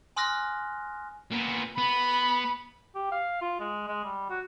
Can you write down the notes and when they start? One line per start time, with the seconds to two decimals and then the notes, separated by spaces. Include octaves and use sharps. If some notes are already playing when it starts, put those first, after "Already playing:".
0.16 G#5 C6 D#6 F6 F#6 A#6
1.31 A#2 B3
1.78 B3 B5
2.95 G4
3.12 F5
3.41 F4
3.60 G#3
3.88 G#3
4.04 G3
4.29 F#4